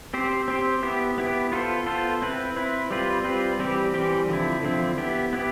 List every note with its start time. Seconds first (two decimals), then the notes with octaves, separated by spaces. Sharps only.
0.14 C4 G4 C5
0.48 C4 G4 C5
0.83 B3 E4 G4
1.18 B3 E4 G4
1.52 B3 F4 A4 C5
1.86 B3 F4 A4 C5
2.22 C4 E4 B4
2.56 C4 E4 B4
2.91 G3 C4 F4 B4
3.24 G3 C4 F4 B4
3.59 E3 G3 C4 G4
3.94 E3 G3 C4 G4
4.29 D3 F3 C4 E4
4.63 D3 F3 C4 E4
4.98 B3 E4 G4
5.33 B3 E4 G4